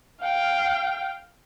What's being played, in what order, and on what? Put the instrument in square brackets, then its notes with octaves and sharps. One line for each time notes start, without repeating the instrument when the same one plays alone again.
[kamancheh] F5 G5